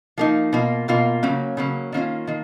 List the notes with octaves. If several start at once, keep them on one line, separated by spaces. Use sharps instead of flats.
F3 A#3 D#4
B2 A#3 F4
B2 A#3 F4
C#3 F#3 A#3 C#4
C#3 F#3 A#3 C#4
D#3 A#3 C#4 F4
D#3 A#3